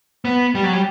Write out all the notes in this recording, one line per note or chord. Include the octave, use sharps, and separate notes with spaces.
B3
G3
F#3
G3